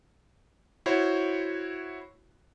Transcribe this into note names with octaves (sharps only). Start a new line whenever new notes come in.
E4 F#4 C5 C#5